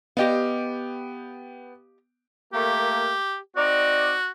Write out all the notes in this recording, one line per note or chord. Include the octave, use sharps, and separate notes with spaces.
B3 G4 D#5 F5 G5
A3 A#3 G4
C4 D#4 F#4 D5